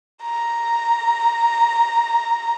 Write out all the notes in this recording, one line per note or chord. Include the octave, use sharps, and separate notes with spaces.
A#5